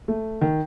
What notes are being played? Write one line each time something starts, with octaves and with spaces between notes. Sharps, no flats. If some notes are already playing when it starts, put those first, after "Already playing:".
A3
D#3